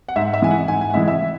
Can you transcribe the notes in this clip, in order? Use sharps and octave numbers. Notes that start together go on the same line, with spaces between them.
F#5
G#2 E5
E5
E3 G#3 G#5
F#5
G#2 G#5
G#5
F#5
E3 G#3 E5
E5